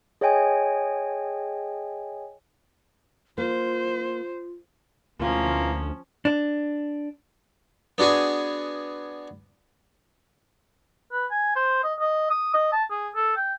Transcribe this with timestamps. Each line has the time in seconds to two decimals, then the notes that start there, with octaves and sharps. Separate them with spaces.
0.21 G#4 C#5 D#5 G5 G#5
3.38 A#3 F4 C5
5.19 D2 B2 E3 F3 A#3 C#4 F4
6.25 D4
7.98 B3 D4 F#4 G#4 G#5
11.12 B4
11.31 G#5
11.56 C5
11.84 D#5
12.00 D#5
12.30 D#6
12.54 D#5
12.72 A5
12.91 G#4
13.15 A4
13.37 G5